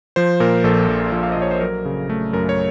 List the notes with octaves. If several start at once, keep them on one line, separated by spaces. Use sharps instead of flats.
F3 C5
A#2 A#4
A#1 A4
A#1
F3
F5
A#2 D#5
C#5
C5
F#3 A#4
C#3
A3
F#2 A#4
C#5